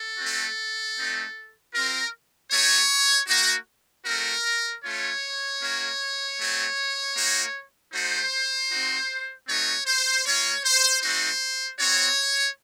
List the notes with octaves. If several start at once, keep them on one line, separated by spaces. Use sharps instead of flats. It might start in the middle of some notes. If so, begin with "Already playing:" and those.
Already playing: A4
A3 C4 F#4
A3 C4 D#4
C4 F4 A#4
A3 D#4 F#4 C#5
A#3 D#4 F#4
A3 C4 F#4 A#4
A3 C#4 F4 C#5
A#3 C#4 F#4
A3 C4 F#4
A#3 D#4 F#4
A3 D#4 F#4 C5
C4 D#4 F#4
A3 C4 D#4 F#4 C#5
C5
A#3 F4 C#5
C5
A3 C4 D#4 F#4 C5
C4 F#4 C#5